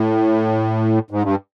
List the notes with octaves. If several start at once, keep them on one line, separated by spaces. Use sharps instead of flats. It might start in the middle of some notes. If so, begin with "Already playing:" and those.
Already playing: A2
G#2
G2